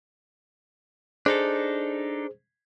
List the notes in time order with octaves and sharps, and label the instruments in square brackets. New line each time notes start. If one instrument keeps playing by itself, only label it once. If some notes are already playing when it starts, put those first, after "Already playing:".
[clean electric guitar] D4 D#4 A4 [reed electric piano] G#4 C5